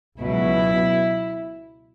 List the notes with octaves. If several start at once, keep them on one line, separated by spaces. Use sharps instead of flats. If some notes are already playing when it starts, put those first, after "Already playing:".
C#2 B2 F#3 E4